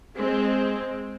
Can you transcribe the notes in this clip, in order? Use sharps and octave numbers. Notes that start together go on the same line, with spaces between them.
G#3 C4